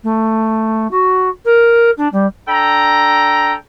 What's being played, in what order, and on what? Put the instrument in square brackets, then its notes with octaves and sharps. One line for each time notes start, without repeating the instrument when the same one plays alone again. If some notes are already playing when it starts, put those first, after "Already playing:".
[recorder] A3
F#4
A#4
D4
G3
[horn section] D4 A4 G5 A#5